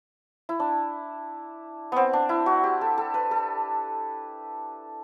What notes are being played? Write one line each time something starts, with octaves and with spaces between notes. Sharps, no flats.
E4
D4
B3 C4
D4
E4
F#4
G4
A4
A4
B4
A4